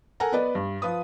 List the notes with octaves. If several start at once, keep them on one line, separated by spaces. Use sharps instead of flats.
A4 A#4 F#5 G#5 A#5
B3 B4 D5 D#5
G2
F3 F4 B4 D#6